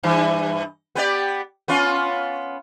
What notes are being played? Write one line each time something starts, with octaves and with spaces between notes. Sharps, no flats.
G2 E3
B3 G4 D5
B3 C#4 F4